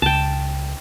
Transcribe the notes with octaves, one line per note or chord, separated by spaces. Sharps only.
C#2 G5 A5